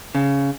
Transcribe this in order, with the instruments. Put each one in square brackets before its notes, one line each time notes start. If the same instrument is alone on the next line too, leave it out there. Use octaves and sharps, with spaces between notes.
[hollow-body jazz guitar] C#3